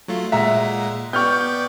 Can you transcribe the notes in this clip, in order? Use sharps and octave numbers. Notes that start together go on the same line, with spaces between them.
F#3 A3 F4
A#2 G#3 E5 F#5 A#5
B3 D5 G5 C#6 F6 G6